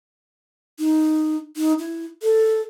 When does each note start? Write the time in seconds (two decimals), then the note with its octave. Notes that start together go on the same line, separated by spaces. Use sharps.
0.79 D#4
1.57 D#4
1.79 E4
2.22 A4